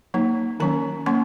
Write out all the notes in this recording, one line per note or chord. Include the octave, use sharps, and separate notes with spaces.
F#3 A#3 D#4
D#3 F#3 C#4 A#5
F#3 A#3 C#4 C6